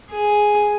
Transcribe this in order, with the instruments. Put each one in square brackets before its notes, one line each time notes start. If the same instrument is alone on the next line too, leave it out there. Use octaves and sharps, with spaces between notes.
[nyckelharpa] G#4